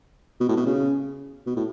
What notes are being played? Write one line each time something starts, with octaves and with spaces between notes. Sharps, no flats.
B2
A2
B2
C#3
B2
A2